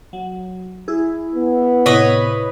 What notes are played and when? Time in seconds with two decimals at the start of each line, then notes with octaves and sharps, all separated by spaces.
0.13 F#3
0.88 E4 G#4
1.35 B3
1.86 A2 C3 E4 B4 C#5 D#5